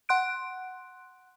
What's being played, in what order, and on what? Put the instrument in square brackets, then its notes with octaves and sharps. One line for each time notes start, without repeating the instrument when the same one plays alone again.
[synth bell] F#5 C6 F#6 D7